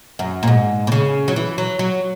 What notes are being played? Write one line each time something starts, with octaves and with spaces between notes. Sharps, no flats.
F#2
A#2
G#2
B2
C#3
F#3
E3
F#3
F#3